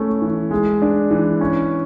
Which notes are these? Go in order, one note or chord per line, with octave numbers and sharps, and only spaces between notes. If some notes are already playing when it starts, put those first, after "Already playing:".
Already playing: A3 C#4 E4
E3
G#3
D4
E3
C#4